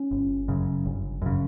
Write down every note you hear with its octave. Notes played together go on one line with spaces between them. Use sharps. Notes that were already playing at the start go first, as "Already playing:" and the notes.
Already playing: C#4
G1
F#2 C#3
G1
F#2 C#3